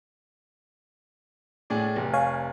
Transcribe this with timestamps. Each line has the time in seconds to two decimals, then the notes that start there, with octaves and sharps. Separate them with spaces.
1.70 A2 G#4 D5
1.96 F1
2.13 C#5 F5 G#5